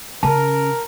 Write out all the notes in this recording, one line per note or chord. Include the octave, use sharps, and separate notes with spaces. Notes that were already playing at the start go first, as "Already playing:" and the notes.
C#3 C#4 A#4 A5